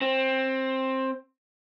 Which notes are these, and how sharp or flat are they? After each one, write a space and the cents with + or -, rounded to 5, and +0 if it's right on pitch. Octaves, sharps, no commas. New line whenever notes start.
C4 +15